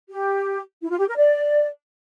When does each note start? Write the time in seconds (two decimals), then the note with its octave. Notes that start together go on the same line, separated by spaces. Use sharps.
0.10 G4
0.81 E4
0.90 F4
0.98 G4
1.08 A#4
1.16 D5